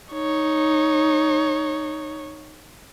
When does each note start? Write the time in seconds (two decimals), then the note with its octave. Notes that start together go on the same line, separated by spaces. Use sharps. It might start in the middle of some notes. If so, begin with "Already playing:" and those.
0.13 D#4 C#5